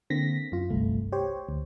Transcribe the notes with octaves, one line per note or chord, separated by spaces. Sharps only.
D3 A#3 C4 A#6 B6
F#2 F4
G1 C2 A3
G4 C5 C#5
D2